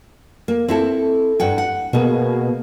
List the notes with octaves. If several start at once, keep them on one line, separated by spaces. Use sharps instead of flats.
A#3
C4 E4 A4
G2 F#5 G5
F#5
B2 A#3 G#4